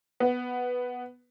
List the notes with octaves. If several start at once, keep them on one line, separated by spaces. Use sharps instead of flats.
B3